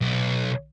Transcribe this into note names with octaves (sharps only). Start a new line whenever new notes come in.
B1